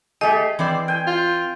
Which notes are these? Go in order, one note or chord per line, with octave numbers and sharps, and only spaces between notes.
A3 G4 G#4 D#5
E3 C4 D5
G5 G#5
F4